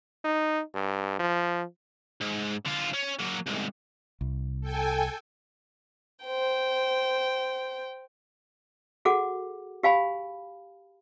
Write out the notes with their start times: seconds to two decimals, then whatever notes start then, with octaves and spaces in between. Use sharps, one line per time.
0.24 D#4
0.74 G2
1.19 F3
2.21 G#2
2.66 D3 F4
2.93 C#4
3.19 F#3 A#3
3.46 C2 G#2
4.21 C2
4.61 A4 G5 G#5
6.25 C5 G5
9.05 F#4 G#4 A4 F#5 D6
9.83 G4 F5 G#5 B5